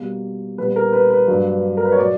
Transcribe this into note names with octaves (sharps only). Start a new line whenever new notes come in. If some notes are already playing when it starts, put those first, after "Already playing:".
Already playing: B2 G3 A#3
A#2 G3 B3 B4
A#4
B4
B4
G2 F#3 A#3
A#4
B4
C#5
A#2 F#3 A#3 D5